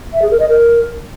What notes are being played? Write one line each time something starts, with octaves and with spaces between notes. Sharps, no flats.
E5
G#4
A#4
D#5
A#4